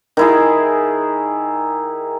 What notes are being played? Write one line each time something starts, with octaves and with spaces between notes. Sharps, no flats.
D#3 E4 G#4